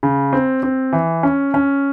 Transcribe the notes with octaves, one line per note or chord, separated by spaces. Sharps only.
C#3
C4
C4
E3
C#4
C#4